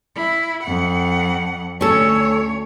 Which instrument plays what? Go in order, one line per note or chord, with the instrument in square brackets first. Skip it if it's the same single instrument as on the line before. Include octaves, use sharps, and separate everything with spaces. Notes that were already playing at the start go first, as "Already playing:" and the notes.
[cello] E4
F2 F#5
[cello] D2 C#5 [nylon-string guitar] C#4 A4